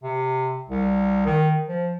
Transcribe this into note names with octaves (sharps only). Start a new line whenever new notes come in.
C3
C2
D#3
F3